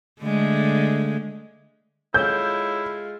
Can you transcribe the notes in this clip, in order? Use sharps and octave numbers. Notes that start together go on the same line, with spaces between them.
D3 G#3 A3
G#3 E4 F4 A4 C#5 G6